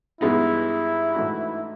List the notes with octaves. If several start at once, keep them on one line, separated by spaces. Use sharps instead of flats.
G2 E3 G#3 B3 D#4 E4
G#2 E3 A3 D4 F#4